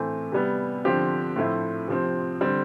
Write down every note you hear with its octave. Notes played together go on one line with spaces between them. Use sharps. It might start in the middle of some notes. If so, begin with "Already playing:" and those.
Already playing: A2 E3 A3 C4
C3 G3 B3
D3 F3 C4 G4
A2 F3 A3 C4 E4
C3 F3 C4
D3 G3 C4